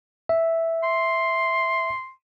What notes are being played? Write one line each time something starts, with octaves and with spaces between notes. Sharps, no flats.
E5
C6